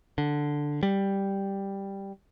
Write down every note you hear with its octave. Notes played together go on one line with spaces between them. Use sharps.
D3
G3